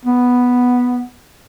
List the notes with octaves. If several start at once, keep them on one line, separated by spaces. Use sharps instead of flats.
B3